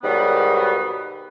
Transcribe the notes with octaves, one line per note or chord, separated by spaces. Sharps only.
G#2 B2 D#3 F#3 G3 B3